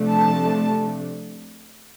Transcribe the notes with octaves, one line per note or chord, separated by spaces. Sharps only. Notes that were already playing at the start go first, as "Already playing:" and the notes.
Already playing: C3 F3 A3 D4
A5